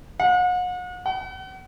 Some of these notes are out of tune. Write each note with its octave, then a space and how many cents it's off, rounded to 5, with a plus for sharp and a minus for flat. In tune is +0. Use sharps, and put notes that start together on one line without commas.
F#5 -40
F#5 +40